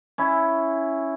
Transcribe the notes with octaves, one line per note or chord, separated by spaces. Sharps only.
C#4 E4